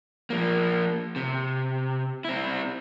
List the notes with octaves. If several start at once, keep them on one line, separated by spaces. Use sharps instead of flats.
F3 A#3
C3
C4 E4